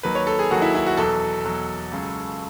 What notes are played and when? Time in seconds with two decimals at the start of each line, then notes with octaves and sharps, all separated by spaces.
0.03 D#2 D#3 F#3 B4
0.15 C#5
0.27 A4
0.39 G#4
0.50 D#2 D#3 F#3 F#4
0.62 E4
0.75 E4
0.87 F#4
0.97 E2 B2 F#3 A4
1.44 E2 B2 F#3
1.92 C#2 C#3 F#3